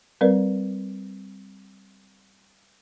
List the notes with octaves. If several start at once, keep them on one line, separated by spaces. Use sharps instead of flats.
G3 C4 A#4 B4 D5